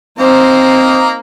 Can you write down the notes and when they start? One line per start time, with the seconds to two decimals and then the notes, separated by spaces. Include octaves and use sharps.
0.18 A#3 C4 D#4 C5 A#5